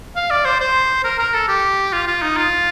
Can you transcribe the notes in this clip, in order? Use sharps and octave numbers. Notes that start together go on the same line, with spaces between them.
F5
D5
C5
C5
A#4
A#4
A4
G4
F4
F4
D#4
F4